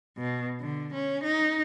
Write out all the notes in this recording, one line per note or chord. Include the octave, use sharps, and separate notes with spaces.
B2
D3
C#4
D#4